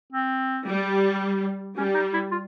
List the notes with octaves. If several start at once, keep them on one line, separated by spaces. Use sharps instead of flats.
C4
G3
G3 C#4
D#4
E4
F4